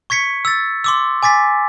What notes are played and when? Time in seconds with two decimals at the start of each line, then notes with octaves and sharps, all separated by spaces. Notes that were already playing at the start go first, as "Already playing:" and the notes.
0.10 C#6 G#6 B6 C#7
0.45 E6 A6
0.84 C6 D6 E6
1.23 G#5 D6 A6 B6